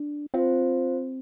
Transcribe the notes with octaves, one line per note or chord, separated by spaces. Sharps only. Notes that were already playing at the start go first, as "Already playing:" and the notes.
Already playing: D4
C4 F4 C5 F5